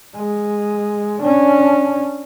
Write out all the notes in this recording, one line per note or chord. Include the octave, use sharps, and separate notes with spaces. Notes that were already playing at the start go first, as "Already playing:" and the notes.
G#3
C#4 D4